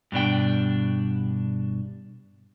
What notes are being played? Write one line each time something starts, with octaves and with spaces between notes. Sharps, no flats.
G2 B2 D4 G5